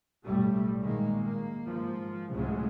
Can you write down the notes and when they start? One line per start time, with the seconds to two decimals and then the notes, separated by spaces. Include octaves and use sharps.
0.24 B1 A2 G3 A3
0.80 A#2 D#3 G#3 A#3
1.24 A#3
1.63 G#2 F3
2.33 C#2 A2 C#3 F#3 G#3